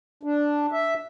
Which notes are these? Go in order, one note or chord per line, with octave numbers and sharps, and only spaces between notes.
D4
E5